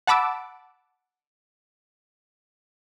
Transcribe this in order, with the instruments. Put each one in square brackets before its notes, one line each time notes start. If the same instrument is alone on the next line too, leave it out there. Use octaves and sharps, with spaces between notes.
[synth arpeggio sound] F#5 A5 B5 D6 E6